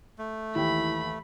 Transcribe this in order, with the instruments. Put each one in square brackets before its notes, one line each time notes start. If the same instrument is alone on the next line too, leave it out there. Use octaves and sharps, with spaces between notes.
[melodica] A3
[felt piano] D#2 E3 G5 [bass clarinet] E4 [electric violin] B5